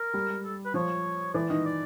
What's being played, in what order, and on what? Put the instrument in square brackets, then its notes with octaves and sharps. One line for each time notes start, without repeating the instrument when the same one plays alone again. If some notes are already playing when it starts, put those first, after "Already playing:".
Already playing: [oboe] A#4
[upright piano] G3
[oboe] A4
B4
[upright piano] F3 [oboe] C#5
[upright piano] E3 [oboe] D5
[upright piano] D#3 [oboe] D#5
[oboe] D5